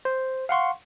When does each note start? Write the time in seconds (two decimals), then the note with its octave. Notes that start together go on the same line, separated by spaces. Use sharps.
0.05 C5
0.49 F5 F#5 C6 C#6